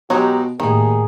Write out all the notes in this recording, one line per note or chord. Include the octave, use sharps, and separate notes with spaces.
B2 F#3 G#3 D#4 G4
D#2 A2 D#3 G#4